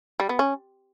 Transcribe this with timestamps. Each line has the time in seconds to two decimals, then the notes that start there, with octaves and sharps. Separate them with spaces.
0.20 G3
0.29 B3
0.39 C#4